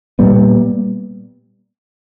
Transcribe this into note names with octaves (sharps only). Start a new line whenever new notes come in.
A#2 G3 B3